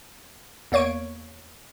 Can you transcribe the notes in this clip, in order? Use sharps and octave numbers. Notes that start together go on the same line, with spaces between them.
E2 A#3 C#5 C#6 D7